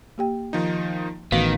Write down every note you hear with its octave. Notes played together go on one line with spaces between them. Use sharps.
A#3 G4 G5
D#3 F3 D#4
A1 D#3 B3 F#4 F5 B6